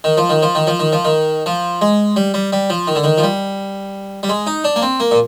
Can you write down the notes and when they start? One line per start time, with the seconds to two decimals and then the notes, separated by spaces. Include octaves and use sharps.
0.04 D#3
0.17 F3
0.29 D#3
0.42 F3
0.55 D#3
0.67 F3
0.80 D#3
0.92 F3
1.05 D#3
1.46 F3
1.81 G#3
2.16 G3
2.34 G3
2.53 G3
2.70 F3
2.87 D#3
2.95 D3
3.04 D#3
3.18 F3
3.23 G3
4.23 G3
4.29 G#3
4.47 D#4
4.64 D4
4.76 A#3
4.82 C4
5.00 A#3
5.11 A#2